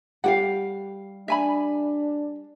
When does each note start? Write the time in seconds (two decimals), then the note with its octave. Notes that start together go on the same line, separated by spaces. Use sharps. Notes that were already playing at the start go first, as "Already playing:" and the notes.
0.24 G3 G4 F5 F#5
1.28 D4 E5 G#5 B5